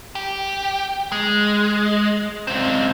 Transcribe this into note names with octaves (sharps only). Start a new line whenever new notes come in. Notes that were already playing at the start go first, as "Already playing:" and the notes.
G4
G#3
C#2 C4